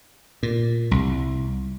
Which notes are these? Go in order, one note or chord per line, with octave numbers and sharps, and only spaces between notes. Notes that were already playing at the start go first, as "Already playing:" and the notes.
A#2
C2